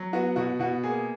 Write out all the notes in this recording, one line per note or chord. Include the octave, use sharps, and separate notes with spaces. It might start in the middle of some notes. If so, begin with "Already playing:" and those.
Already playing: F#3
B3 F#4
B2 F#4
B2 F#4
A#3 G#4